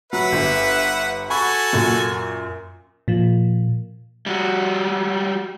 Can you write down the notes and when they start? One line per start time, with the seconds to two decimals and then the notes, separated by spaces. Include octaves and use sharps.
0.13 F#3 B4 E5 F#5
0.32 G1
1.30 F#4 A4 G#5 B5 C#6
1.73 F#2 A#2
3.08 A#2 F3
4.26 G3 F#4